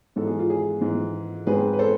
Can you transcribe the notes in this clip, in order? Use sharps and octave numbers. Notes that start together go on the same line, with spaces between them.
G#2 E3 G#3 A4
G#4
F4
G#4
G#2 E3 G#3
G#2 G#3 C4 G#4 B4
B4
A4 C5